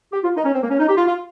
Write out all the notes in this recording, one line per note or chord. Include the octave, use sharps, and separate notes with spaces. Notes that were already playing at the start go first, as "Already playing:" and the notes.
G4
F4
D#4
C#4
C4
A#3
C#4
D#4
G4
F4
F4